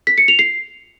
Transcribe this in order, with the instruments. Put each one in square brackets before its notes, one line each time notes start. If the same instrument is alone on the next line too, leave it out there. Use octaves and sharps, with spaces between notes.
[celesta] B6
C#7
F7
C7